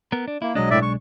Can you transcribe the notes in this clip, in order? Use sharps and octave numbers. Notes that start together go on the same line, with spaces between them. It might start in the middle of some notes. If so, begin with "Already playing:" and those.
B3 A#4
D4
A#3 E4
B1 F#3 G#3 D4 D#5
A2 D5 E5
C#6